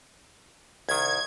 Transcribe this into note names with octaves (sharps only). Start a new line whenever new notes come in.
C2 D#3 G#6